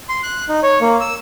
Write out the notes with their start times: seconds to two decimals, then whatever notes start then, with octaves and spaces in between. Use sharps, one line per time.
0.09 C6
0.23 F#6
0.49 D#4
0.63 C#5
0.81 A#3
1.00 E6